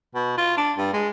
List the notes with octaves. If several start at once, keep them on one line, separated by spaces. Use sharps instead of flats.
B2
F4
D4
G2
G#3